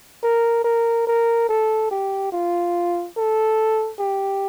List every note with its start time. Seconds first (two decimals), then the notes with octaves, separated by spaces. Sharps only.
0.23 A#4
0.65 A#4
1.07 A#4
1.49 A4
1.91 G4
2.32 F4
3.17 A4
4.00 G4